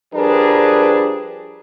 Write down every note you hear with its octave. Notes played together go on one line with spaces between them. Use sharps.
F3 G3 D4 G#4 A#4 B4